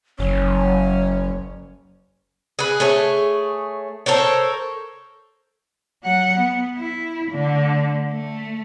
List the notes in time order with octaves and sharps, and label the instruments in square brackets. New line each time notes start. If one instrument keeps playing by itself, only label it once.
[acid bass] F#1 [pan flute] F#3 [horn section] C#4
[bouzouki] G#4 B4
A3 G#4 C#5
A4 A#4 C5 C#5
[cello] F#3 F#5
B3
E4
D3 A3
A3